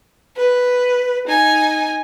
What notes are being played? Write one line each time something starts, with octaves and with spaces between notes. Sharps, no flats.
B4
D#4 G#5